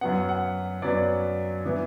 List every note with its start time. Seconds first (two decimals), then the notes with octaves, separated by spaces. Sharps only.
0.01 F#2 F#3 B3 F#5
0.29 F#5
0.82 F#2 F#3 B3 D5
1.65 E3 B3